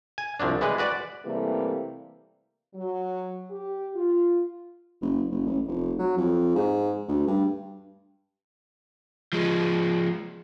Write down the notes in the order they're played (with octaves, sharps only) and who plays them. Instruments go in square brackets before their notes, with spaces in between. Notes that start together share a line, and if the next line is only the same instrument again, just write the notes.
[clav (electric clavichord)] G#5
C2 F3 F#3 D4
E3 G3 G#3 G#4 B4
F#4 B4 D5
[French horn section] C3 E3 G3 A3 A#3
F#3
G4
F4
[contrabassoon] F#1
F#1
A1
F1
F#3
F2
G#2
D2
G2
[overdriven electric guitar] F3 G#3